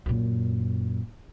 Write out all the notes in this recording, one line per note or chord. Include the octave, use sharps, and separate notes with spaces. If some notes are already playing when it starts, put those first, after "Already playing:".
F#2 A#2